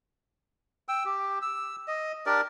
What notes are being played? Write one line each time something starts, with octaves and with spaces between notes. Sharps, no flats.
G5 E6
G4
E6
D#5
D4 G4 A#4 D5